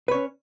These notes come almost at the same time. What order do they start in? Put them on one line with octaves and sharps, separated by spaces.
B4 C#5 C#4